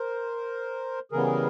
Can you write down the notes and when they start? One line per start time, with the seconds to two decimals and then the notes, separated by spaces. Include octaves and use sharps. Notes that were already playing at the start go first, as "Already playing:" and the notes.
Already playing: A#4 C5
1.12 C#3 E3 G3 B3 G#4 A#4